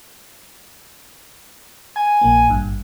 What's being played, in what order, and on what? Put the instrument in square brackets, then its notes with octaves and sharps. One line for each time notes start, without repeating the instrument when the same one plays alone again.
[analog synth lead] G#5
[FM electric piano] A#1 A#3
G#1 G2